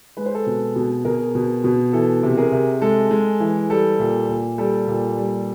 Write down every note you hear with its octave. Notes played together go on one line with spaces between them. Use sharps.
G#3 B4
C5
A4 B4
B2
B2
B2 G#4 A#4
B2
B2
E3 A4
C3
G#4 A#4
C3
G#3 A4
G#3
E3
G3 A4
A#2
A#2
G3 A4
A#2
G3